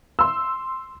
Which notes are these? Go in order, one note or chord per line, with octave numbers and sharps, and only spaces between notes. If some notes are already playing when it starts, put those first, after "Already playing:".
C6 E6